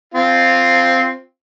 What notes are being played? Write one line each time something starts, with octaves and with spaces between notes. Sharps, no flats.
C4 F4